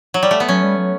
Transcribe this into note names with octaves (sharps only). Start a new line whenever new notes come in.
F#3
G3
A3
B3
F#3 C#4
G3
F#3